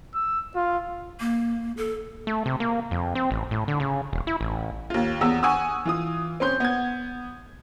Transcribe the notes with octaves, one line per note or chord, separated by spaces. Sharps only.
E6
F4
A#3
A4
A3
C3
A#3
F2
C4
A1
A2
D3
C#3
E1
E4
A1
D#2 F4
E2 B3 E6
F#5 G#5 C#6 D#6 E6
E3 F4 D#6
C4 C#4 C6 G6
B3 G#6